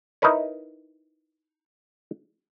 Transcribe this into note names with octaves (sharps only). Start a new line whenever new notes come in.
D#4 E4 A#4 B4 C#5